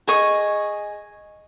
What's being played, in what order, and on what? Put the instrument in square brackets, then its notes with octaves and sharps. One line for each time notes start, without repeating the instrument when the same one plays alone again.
[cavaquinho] G#4 D#5 C#6